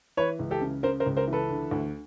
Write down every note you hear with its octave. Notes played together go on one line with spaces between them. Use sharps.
E3 B4 C#5
C#2
G4 A4
C#3
C#3 A#4 C5
A#4 C5
C#2
A#4 C5
E3
A4 B4
D3
D2